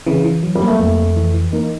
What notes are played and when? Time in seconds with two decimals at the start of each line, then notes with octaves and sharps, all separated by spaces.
0.07 C#3 E3
0.25 E3
0.43 F#3
0.55 G3
0.61 A#3
0.67 A3
0.80 F2 A3
0.98 F2
1.16 E3
1.34 E3
1.52 A#3 D#4